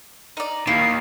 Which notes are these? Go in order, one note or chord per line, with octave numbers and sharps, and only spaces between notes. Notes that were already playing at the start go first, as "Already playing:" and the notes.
D#4 D5
D#2 D#3 A#3 E4 C7